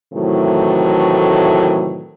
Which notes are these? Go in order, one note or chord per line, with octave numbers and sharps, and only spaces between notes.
A2 C3 D#3 E3 F#3 A3